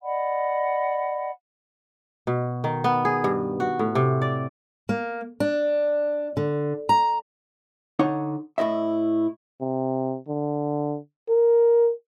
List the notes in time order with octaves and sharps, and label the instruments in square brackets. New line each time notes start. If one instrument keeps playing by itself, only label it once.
[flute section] D5 D#5 F#5 B5
[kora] B2
D#3
B3
G#4
G2
F#4
A2
C3
D5
[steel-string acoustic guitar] A#3
D4
D3
A#5
[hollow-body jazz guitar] D3 D#4 C#5 F#5
A2 E4 D#5 E5
[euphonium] C3
D3
A#4